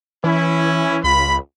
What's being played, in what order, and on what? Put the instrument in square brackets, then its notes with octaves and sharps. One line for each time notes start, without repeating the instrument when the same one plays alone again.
[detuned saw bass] E3 [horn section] C#4 E4
[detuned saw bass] C#2 [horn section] F4 B5